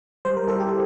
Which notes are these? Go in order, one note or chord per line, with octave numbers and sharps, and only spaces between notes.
G3 C5
A#4
E4 A4
G4